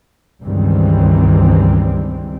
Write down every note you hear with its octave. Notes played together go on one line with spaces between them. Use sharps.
C#2 G2 D#3 E3 G3 C4